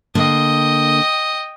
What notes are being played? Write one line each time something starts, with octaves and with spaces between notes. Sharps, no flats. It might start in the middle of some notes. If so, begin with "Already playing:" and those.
D3 A#3 D#5 G5